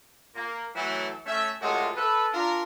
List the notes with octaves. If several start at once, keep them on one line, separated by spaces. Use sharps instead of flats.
A#3
E3 F#3 A3
A3 C#4 E5
F#2 C3 G#3 A3 F4 F#4
A4 B4
D4 F4 A#4